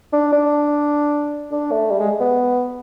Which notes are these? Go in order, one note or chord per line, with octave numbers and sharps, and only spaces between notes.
D4
D4
D4
A3
G3
G#3
B3